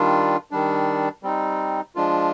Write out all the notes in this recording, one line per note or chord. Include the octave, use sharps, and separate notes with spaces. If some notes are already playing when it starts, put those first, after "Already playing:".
Already playing: D#3 G3 D4 F4
D#3 G3 D4
G3 C4 D#4
F3 G#3 D4 F4